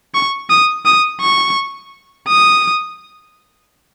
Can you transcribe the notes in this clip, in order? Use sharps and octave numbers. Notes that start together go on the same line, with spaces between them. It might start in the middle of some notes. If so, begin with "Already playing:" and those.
C#6
D#6
D#6
C#6
D#6